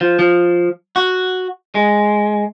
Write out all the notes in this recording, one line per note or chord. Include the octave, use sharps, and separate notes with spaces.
F3
F3
F#4
G#3